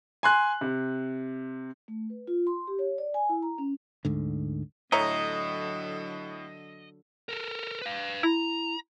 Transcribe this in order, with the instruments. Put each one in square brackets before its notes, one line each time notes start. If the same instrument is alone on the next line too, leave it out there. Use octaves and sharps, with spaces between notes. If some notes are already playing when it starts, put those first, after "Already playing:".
[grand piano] G#5 C6 F#6
C3
[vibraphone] A3
B4
F4
C6
G4
C#5
D5
G#5
E4
A#5
C#4
[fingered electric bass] D2 G#2 D3
[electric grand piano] A2 [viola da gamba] D3 F#3 A4 [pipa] C#5 E5 A#5 [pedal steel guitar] D#5
[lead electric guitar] A4 A#4
B4 F5
[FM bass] E4 [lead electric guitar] A#5